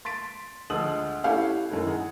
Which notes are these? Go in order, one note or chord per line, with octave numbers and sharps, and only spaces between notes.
C6 A6 B6 D7
D2 F3 G#3 D#6 E6 F#7
A3 C#4 E4 G4 F5 F#5
F#2 D#3 A3 E4
G#4 F#5